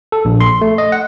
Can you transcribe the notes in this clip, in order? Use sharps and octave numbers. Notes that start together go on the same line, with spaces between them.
A4
A#1
C6
A3
D#5
F#5